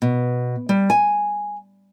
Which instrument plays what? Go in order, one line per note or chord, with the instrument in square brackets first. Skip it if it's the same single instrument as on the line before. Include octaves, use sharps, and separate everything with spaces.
[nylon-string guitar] B2
G3
G#5